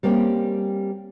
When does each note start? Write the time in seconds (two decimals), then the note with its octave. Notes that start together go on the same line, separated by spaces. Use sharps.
0.03 G3 A#3 C4 C#4